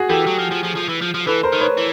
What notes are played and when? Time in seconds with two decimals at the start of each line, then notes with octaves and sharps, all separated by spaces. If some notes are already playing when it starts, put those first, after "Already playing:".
Already playing: F#4 G#4
0.09 E3 G4 A4
0.27 F#3
0.39 F3
0.52 F3
0.64 F3
0.77 F3
0.89 E3
1.02 F3
1.14 F3
1.27 E3 A4 B4
1.43 A#4 C5
1.52 D#3
1.61 B4 C#5
1.77 E3